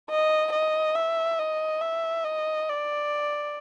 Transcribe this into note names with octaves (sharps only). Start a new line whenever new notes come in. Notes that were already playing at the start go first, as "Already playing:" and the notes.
D#5
D#5
E5
D#5
E5
D#5
D5